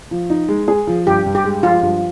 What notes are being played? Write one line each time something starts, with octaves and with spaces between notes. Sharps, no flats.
F3
D#4
G#3
G#4
F3
G2 G4
G2
G4
G#3
F3 F4
G2